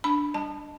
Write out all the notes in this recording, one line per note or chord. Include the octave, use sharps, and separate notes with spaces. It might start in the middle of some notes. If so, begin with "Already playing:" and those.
D4 B5
G3 A5